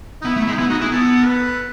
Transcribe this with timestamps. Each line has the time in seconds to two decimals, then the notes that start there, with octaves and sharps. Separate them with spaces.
0.22 D#4
0.25 B3 E4
0.36 A3
0.41 E4
0.47 G#3
0.53 D#4
0.58 B3 E4
0.70 D#4 F#4
0.81 E4 G#4
0.92 B3 A4
1.26 B4